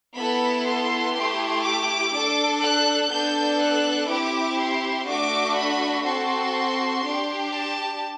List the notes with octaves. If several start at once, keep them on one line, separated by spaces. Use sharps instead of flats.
B3 E4 A4 B5
C6
A3 E4 G4
D6
D4 A4
F#6
B3 D4 A4 G6
F#6
C4 E4 G4 D6
C6
A3 D4 F#4 D6
B5
C4 F#4 A4 C6
D4 G4
A5